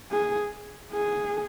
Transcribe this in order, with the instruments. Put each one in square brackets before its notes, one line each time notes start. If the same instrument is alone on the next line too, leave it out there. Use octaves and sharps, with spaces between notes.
[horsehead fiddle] G#4
G#4